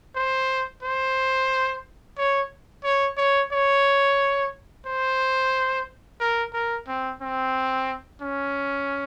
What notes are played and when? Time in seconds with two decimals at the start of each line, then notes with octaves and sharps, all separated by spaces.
0.15 C5
0.83 C5
2.18 C#5
2.84 C#5
3.17 C#5
3.52 C#5
4.86 C5
6.20 A#4
6.53 A#4
6.88 C4
7.21 C4
8.21 C#4